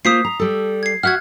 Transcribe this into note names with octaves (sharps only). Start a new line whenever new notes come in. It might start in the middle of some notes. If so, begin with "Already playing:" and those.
A#3 F4 C5 D#6 B6 C7
A#5
G3 A4
G#6 C7
F#4 E5 F#5 F6 F#6 G#6